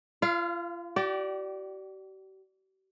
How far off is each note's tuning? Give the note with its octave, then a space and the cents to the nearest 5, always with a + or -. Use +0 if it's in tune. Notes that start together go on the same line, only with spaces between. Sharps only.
F4 -35 F5 +0
G4 -45 D5 +0 G5 -30